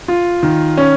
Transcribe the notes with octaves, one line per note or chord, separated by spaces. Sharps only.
F4
D#3
C#4